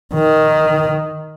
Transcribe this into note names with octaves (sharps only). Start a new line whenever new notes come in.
D#3